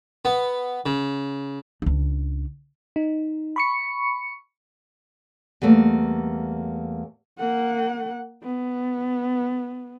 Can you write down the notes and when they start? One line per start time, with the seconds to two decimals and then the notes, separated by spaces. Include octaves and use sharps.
0.25 B3
0.86 C#3
1.82 C#2 D4
2.96 D#4
3.56 B5 C#6 C#7
5.62 E2 G3 A3 A#3
7.39 A#3 F#5
8.44 B3